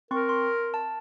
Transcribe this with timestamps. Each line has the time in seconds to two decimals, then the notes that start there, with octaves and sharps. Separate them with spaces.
0.11 C4 A#4 C6 C#6
0.29 C6
0.74 A5